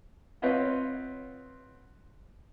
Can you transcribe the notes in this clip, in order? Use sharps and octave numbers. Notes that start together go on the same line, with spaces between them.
C4 F4 B4 C#5 D#5 F#5